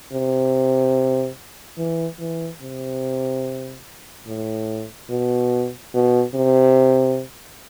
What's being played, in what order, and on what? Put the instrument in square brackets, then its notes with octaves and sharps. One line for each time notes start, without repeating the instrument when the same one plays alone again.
[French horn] C3
E3
E3
C3
A2
B2
B2
C3